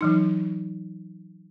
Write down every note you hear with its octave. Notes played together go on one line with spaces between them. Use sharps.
E3 F#3 D#4